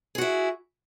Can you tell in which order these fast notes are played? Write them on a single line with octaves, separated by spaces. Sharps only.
G#4 F#4 E4